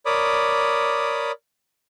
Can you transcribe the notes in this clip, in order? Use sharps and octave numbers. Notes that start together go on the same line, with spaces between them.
A#4 C#5 D5 B5 D6 D#6